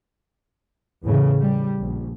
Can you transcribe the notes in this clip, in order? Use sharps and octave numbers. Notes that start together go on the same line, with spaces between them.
E2 A2 C#3
G3
A#1